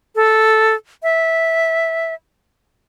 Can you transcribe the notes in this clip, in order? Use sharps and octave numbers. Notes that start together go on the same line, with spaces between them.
A4
E5